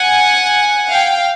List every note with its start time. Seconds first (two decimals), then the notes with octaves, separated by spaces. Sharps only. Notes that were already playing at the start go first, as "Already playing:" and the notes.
Already playing: F#5 G#5
0.90 F5 G5